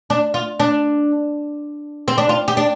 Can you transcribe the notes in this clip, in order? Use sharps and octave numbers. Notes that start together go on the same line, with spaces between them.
D4
F4
D4
C4
D4
F4
G4
D4